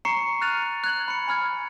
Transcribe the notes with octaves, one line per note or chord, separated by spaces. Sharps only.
A#5 C#6 C7 C#7
F6 F#6 A6 D#7 F7
F#6 G#6 F#7
B5 C#7
G#5 B5 F6 G#6